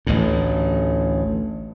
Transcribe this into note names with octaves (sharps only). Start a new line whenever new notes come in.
A1 D2 A2